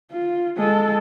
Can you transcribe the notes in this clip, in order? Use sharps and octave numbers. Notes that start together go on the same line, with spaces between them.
F4
G#3 A4